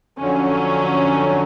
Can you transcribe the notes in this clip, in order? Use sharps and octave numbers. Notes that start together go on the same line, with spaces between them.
F2 D3 F#3 C#4